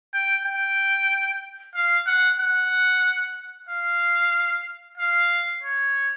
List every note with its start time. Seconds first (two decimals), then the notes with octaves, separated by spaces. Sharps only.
0.14 G5
0.45 G5
1.75 F5
2.07 F#5
2.40 F#5
3.69 F5
4.98 F5
5.62 C#5